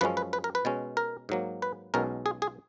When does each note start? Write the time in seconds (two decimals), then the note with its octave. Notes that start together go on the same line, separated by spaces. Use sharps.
0.01 F#2 F3 G#3 C#4 B4
0.17 B4
0.33 B4
0.44 A#4
0.55 B4
0.65 B2 G#3 C#4
0.97 A#4
1.29 G#2 F#3 A#3
1.62 B4
1.94 B1 B2 G#3 C#4 A#4
2.26 G#4
2.42 G#4